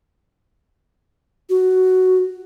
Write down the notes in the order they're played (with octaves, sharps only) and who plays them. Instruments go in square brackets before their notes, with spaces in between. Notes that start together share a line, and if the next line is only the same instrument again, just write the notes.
[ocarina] F#4